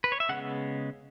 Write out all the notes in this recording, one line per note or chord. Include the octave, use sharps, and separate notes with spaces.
B4
C#5
E5
C#3 G#3 B3 F#5